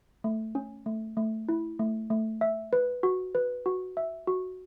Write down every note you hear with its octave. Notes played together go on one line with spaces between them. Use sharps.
A3
C#4
A3
A3
E4
A3
A3
E5
B4
F#4
B4
F#4
E5
F#4